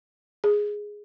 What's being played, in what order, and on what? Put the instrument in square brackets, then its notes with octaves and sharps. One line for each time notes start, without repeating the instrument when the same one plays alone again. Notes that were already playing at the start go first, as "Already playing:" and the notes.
[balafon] G#4